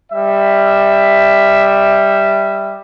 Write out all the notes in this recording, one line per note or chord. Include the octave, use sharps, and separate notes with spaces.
G3 E5